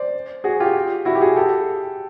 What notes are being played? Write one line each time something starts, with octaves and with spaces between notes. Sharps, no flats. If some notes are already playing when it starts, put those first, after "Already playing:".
Already playing: C5 D5
F#4 G#4
F4 G4
E4 F#4
G4
F#4 G#4
G4 A4